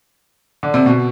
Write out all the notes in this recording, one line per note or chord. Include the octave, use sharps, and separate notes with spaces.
D3
C3
B2